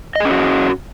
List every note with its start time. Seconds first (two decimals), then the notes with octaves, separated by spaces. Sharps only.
0.16 D#5
0.20 G#4
0.25 C#4
0.30 F#4